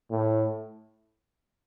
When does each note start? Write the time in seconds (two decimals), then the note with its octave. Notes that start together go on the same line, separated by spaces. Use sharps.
0.11 A2